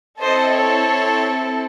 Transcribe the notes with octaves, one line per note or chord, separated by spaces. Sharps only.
C4 E4 A4 C5 D#5
C#5